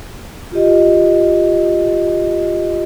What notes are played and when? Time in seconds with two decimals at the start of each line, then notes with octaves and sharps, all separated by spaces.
0.52 F4 G4 D#5